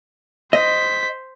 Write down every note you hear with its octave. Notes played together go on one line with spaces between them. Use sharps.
C5 D#5 B6